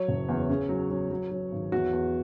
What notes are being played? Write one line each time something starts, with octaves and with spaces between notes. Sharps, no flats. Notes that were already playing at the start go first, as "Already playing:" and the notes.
Already playing: F#3 C#5
F#1
E2
C#3
F#3
F#3
F#3
F#3
G#1
E2 F#4
E2